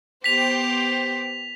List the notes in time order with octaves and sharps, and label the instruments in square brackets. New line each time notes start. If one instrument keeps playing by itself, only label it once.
[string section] B3 G4 C5 [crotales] B6 F7